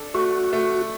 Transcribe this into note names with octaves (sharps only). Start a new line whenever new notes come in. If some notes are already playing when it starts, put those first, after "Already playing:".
Already playing: D4 A4
A3 F#4
A3